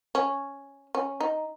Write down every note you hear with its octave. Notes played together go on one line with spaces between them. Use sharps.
C#4
C#4
D#4